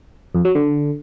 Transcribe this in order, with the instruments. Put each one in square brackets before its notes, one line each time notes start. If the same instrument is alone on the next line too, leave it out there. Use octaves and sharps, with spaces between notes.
[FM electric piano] F2
F#3
D3